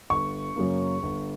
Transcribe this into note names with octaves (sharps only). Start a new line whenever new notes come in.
G1 C#6
F#2 C#3 F#3 A#3
G1